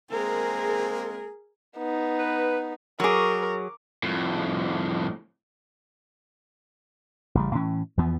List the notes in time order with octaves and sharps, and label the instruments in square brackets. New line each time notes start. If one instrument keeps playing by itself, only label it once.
[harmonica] G#3 A#3 C4 [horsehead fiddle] G#4 A#4
[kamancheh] B3 D#4
[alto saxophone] B4
[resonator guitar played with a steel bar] F#3 G#4 [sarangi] A#4 [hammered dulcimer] C#6 D6
[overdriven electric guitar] F2 A2
[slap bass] A1 C#3 G3
A2 E3 C#4
E2 E3 F3 B3